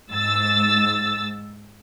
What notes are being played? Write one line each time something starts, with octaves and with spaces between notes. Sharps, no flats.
G#2 E6 A6